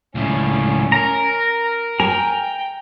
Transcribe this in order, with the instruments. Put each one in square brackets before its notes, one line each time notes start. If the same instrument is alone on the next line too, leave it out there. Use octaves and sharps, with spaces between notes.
[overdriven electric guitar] C#2 A2 [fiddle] C#4
[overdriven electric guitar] A#4 [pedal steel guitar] A#5
[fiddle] G5 [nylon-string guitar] G#5 [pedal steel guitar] A#5